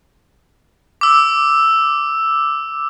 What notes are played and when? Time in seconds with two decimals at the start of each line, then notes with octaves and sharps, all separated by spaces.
1.01 D6 E6